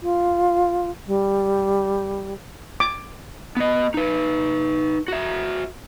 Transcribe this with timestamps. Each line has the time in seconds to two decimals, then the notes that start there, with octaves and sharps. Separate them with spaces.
0.02 F4
1.07 G3
2.80 D6
3.57 B3 D#5
3.94 D#4 B4
5.08 F#4 E5